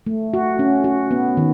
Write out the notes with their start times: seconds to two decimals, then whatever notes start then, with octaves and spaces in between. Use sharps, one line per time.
0.07 A3
0.34 F#4
0.59 C#4
0.84 F#4
1.11 B3
1.37 D#3